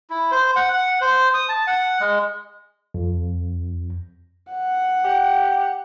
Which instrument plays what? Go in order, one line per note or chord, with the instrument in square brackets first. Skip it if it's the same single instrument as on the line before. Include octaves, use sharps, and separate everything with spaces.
[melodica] E4
C5
F#5
F#5
C5
D#6
A5
F#5
G#3
[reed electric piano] F2
[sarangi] F#5
[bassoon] G4